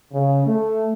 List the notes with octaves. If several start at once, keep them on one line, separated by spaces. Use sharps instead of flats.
C#3
A3